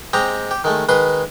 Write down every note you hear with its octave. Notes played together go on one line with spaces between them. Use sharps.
G#3 C4 G4 D#5 A#5
G4
D#3 G#3 A3
D#3 G#3 B4 C6 D#6